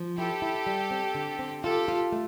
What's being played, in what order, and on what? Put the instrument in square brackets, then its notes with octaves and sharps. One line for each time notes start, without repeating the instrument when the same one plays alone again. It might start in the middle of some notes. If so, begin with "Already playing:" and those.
Already playing: [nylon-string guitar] F3
[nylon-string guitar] E4 [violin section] G4 A4
[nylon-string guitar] E4
G3
C4
D3
C4
[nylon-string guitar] F4 [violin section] G4 A4
[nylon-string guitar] F4
A3